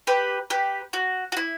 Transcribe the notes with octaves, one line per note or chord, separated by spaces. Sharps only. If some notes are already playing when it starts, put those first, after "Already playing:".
G4 B4
G4 B4
F#4
F#4
E4